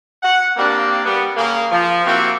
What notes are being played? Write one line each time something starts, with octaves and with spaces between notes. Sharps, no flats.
F#5
A#3 C4 D4 G4 D5 F5
G3 B3
C#3 A#3
F3
A#3 C4 E4 F#4 G4